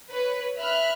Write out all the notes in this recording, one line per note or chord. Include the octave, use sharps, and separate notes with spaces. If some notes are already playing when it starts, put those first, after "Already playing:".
B4 C#5
E5 B5 F6 F#6